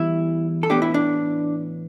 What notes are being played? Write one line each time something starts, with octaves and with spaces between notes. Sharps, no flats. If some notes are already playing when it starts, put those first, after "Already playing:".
Already playing: E2 E3 G3 E4
A4
A2 E3 B3 D4 G4
E4
D4